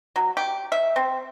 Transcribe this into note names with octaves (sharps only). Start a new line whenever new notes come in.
F#3
G4
E5
C4